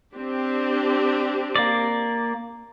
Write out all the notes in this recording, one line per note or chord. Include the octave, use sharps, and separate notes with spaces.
C4 D4 G4
A#3 D5